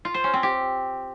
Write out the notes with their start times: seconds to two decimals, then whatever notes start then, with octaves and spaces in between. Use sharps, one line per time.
0.05 F4
0.14 C5
0.24 C#4
0.33 C4
0.43 G4